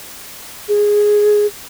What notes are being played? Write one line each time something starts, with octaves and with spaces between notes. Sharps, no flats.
G#4